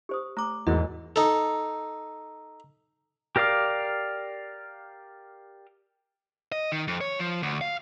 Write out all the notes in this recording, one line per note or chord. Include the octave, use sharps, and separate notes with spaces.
G4 C5 D#6
A3 A#5 D6
E2 G#2 A3 E4 F#4 A#4 D#5
D#4 A4
G4 A#4 D5 F5 D6
D#5
D#3
F2
C#5
F3
D2
F5